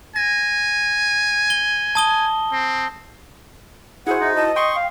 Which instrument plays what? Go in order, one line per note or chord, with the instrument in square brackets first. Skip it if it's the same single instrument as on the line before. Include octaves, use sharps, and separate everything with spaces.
[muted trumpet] G#5 [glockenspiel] A#6
[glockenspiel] G7
A5 D#6 G7
[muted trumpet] C4
[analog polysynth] E4 F#4 C5 [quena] G#4 [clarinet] F#5
[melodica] D#4
[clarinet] D#5 [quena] A5
[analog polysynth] G5 [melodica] C6 C#6 [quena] D#6
[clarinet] F5